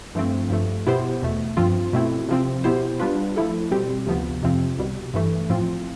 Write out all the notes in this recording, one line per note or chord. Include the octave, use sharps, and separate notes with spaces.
G2 F3 A3 C4
G2 F3 A3
B2 B3 E4 G4 C5
E2 B2 A3
G2 F3 C4 F4
B2 A3 C4 E4
C3 F3 C4
B2 B3 E4 G4 C5
G3 B3 D4 F4 B4
F3 A3 E4 A4
B2 G3 C4 G4
D2 C3 F3 B3
F2 C3 F3 C4
C2 B2 G3
G2 E3 A3
A2 F3 C4 F4